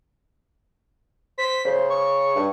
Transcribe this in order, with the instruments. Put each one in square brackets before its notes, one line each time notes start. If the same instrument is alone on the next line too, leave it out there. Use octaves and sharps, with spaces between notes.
[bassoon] C5 [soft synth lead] B6
[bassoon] C#3 [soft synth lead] C5
[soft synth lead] C#6
[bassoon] G2